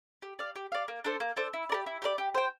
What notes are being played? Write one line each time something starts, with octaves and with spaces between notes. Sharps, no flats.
G4
D5 F5
G4
D5 F5
A#3
D4 A4 C5
A#3
D4 A4 C5
E4
G4 A#4 D5
E4
G4 A#4 D5
G4
C5 G5